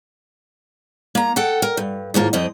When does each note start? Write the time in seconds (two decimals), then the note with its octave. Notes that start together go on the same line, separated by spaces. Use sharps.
1.15 A#3 A#5
1.36 A4 F#5 G5
1.62 A#4
1.77 G2
2.14 D#2 G#2 A#3 F4
2.33 F2 C4 D#5